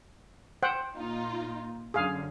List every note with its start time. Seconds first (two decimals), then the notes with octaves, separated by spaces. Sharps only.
0.63 C5 F#5 G5
0.95 A#2 D#4 F4
1.94 F#2 D3 G#4 F5